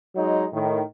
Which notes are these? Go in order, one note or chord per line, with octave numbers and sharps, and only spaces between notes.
F#3 G#3 D#4
A2 D#3